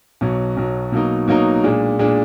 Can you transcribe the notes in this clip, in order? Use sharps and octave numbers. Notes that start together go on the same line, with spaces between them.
B1 B2 F#3
B1 B2 F#3
B2 F#3 A#3 D#4
B2 F#3 A#3 D#4
A#2 G#3 D4
A#2 G#3 D4